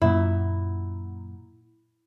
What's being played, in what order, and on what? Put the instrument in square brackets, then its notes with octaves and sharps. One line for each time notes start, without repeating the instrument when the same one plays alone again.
[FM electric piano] F#2 A#2 [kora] E4